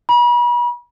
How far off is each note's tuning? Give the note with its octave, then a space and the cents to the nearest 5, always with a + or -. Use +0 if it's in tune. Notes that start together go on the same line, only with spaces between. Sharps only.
B5 -40